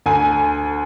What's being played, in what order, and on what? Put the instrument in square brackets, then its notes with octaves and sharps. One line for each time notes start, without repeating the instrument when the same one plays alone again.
[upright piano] D2 G#5